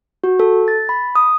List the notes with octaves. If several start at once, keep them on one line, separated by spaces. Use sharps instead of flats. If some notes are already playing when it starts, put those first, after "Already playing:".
F#4
A4
A6
B5
D#6